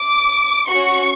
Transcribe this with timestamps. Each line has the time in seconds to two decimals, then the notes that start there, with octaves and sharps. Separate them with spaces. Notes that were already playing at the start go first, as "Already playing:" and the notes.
Already playing: D6
0.68 C#4 F#4 C#6